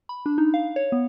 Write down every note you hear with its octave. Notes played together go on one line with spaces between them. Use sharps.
B5
D4
D#4
F5
C#5
B3